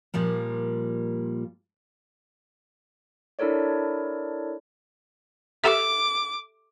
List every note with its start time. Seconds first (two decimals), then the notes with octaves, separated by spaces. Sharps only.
0.14 A#2 F3 G3 A#3
3.39 D4 E4 A4 A#4 C#5 D5
5.64 G4 A4 E5 D6